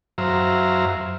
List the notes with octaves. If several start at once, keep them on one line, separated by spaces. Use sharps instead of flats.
F#2 F#3 C5 E5 F5 A#5